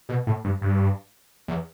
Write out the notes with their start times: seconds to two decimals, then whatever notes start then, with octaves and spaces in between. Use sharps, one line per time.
0.09 B2
0.27 A2
0.44 G2
0.61 G2
1.48 E2